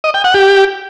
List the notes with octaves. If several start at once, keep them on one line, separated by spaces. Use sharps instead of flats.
D#5
G5
F#5
G4